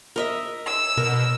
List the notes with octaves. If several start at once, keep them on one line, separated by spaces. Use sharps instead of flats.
A#4 D#5 E5
E6
B2 A#4